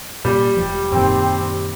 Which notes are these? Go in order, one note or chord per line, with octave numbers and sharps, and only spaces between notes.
A#2 G3
E1 F3 G4
F#2 A#2 D#3 C4